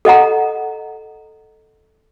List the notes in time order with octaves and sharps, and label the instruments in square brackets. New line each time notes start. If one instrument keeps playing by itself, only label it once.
[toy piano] A4 D#5 F#5 A#5